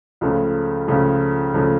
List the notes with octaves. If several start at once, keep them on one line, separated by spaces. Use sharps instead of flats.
C#2 C#3 F3 A3
C#2 C#3 F3 A3
C#2 C#3 F3 A3